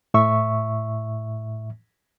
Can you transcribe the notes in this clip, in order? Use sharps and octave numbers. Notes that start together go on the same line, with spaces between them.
A2 E5 C#6